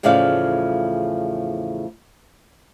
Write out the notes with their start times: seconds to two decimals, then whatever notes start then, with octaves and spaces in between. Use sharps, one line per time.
0.03 E2 A2 C#3 F3 D5 F5